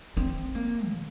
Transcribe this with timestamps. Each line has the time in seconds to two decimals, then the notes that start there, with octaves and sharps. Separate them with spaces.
0.17 C4
0.55 A#3
0.92 A#2